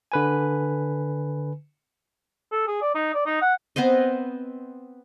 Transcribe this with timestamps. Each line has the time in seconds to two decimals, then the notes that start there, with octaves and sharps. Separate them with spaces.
0.12 D3 B4 G#5
2.52 A4
2.67 G#4
2.82 D5
2.95 D#4
3.14 D5
3.26 D#4
3.41 F#5
3.76 B3 C4 C5 D#5